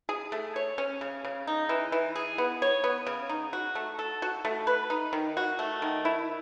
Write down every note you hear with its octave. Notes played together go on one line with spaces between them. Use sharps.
G#4
A3
C#5
C#4
C#3
C#3
D#4
E3
E3
G#4
B3
C#5
B3
C#3
D#4
F#4
A3
A4
F#4
A3
B4
D#4
D#3
F#4
A3
D#3
E4